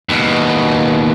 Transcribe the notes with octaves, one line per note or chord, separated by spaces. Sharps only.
D#2 B2